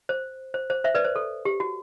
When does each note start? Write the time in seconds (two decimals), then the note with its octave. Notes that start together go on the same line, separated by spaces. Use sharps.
0.09 C5
0.54 C5
0.70 C5
0.84 C5 E5
0.95 B4 D5
1.05 C5
1.16 A4
1.45 G4
1.60 F#4